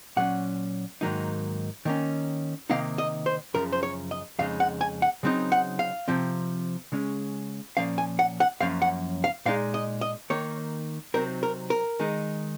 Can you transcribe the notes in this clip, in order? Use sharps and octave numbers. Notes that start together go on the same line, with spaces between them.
A#2 F#3 C#4 F#5
G#2 D#3 F#3 A#3 D#4
D#3 A#3 C#4
C3 D#3 A#3 D#4 F5
D#5
C5
F#2 C#3 F3 A#4
C5
C#5
D#5
F2 C#3 G#3 D#4 F5
F#5
G#5
F#5
C#3 F#3 C4 D#4
F#5
F5
C3 F3 C4
C#3 G#3 C#4
A#2 F3 A#3 C#4 F5
G#5
F#5
F#5
F#2 F3 A#3 C#4 F5
F#5
F5
A#2 G#3 D#4 F5
D#5
D#5
D#3 A#3 D#4 C#5
C3 F#3 C4 D#4 A#4
A#4
A#4
D#3 G#3 D#4